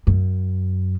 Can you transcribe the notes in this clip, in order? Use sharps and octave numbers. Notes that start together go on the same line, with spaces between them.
F#2